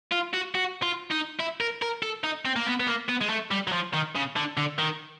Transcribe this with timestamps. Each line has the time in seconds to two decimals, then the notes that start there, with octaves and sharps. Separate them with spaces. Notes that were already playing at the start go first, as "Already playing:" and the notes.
0.12 F4
0.33 F#4
0.55 F#4
0.83 F4
1.11 D#4
1.39 E4
1.60 A#4
1.82 A#4
2.03 A4
2.24 D#4
2.45 C4
2.56 A#3
2.67 B3
2.80 B3
2.87 A#3
3.09 B3
3.22 G#3
3.30 A3
3.51 G3
3.68 F#3
3.73 F3
3.94 D#3
4.15 C#3
4.36 D3
4.57 D3
4.79 D#3